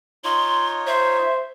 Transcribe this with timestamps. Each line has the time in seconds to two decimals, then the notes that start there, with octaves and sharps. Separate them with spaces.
0.24 D#4 F4 C#5 C6
0.87 C5 E5